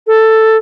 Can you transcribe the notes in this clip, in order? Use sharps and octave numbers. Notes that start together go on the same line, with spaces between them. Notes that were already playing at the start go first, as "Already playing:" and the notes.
A4